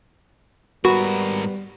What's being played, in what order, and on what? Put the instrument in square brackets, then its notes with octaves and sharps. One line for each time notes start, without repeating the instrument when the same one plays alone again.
[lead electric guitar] G#2 A#4 [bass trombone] G3 [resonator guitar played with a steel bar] B3 [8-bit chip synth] F#4